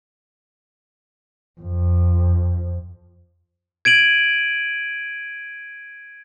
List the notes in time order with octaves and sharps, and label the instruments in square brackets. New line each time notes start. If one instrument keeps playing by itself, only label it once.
[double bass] F2
[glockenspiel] G#6 D7 D#7 F#7